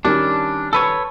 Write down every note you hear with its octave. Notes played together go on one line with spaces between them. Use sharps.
D#3 G3 C#4 D4
A4 B4 C#5